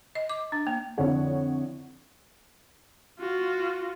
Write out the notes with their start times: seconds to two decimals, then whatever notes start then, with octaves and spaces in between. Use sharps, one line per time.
0.15 D#5
0.29 D6
0.52 D4
0.67 A#3
0.98 F2 D3 E4 C#5 F#5
3.19 F4 F#4